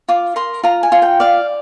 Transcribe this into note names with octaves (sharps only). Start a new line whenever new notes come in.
F4 D6
A#4 C6
F4 A#5
G#5
F4
G5
D5 F5